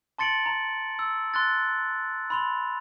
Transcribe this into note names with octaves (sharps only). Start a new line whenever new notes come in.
A5 C6 A6 C#7 D7 F#7
A#5
E6
C6 F#6 A6
B5 C6 F7